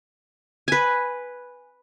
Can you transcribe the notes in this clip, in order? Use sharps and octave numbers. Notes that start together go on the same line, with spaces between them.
B4 G#5